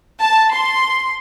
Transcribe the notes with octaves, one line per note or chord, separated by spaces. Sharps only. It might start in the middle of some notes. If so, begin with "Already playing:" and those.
A5
C6